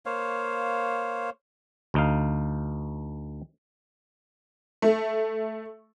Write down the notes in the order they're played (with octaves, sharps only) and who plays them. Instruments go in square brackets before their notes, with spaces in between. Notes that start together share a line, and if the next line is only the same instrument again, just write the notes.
[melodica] A#3 C5 C#5 F5
[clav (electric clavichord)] D2 D#4 F5
[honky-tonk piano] A3